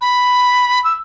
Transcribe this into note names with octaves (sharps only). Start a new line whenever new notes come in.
B5
E6